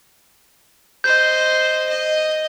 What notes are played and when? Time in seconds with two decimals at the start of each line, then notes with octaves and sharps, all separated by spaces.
1.04 C5 D#5 G6
1.89 D#5